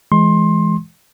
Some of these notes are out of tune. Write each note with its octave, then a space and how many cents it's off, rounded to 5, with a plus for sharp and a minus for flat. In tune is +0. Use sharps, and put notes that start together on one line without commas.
E3 +10 G#3 +10 C6 +20